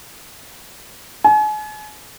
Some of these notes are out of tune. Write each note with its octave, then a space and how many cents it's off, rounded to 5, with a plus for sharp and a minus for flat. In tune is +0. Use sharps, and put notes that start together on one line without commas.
G#5 +40